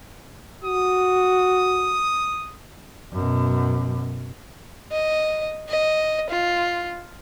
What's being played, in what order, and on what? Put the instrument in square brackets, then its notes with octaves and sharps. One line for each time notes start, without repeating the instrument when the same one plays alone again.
[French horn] F#4 [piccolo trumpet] D#6
[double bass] F#2 B2
[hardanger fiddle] D#5
D#5
F4